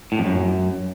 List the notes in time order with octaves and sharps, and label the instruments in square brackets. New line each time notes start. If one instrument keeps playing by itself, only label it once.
[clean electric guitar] A2
F2
F#2